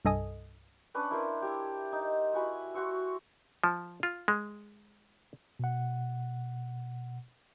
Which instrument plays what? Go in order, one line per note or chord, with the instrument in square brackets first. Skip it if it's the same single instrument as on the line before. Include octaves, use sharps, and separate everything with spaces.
[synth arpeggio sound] C2 G2 A4 D#5 G#5 D#6
[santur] C#4 D4 B4
E4 A#4 C5
E4 G4
D#4
E4 F#4 G#5 B5
F#4 C5 C#6 E6
[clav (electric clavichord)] F3
F4
G#3
[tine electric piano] B2 F#5